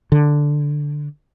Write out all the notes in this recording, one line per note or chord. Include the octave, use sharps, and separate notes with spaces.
D3